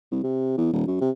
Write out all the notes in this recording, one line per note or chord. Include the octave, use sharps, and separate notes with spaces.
C2
C3
E2
D#1
F#2
C3